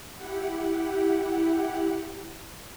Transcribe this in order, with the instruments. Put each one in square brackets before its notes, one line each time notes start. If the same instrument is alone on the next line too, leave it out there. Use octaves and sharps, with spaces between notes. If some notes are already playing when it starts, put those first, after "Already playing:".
[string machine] E4 G4 F#5